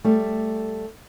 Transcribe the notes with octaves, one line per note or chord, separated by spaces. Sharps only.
G3 A3